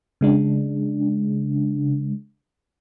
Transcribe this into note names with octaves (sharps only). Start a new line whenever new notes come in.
C#3 G#3 D4